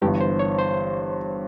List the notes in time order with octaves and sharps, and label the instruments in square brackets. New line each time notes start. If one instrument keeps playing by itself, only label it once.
[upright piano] G1 G2 E3 [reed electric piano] G4
[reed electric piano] C5
C#5
C5